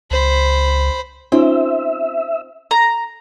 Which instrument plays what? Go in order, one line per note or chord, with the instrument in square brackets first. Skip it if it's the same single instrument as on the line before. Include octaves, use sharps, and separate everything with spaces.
[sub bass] C#2 [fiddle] C5 B5
[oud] C4 [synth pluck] C#4 D#4 F4 [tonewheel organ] E5
[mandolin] A#5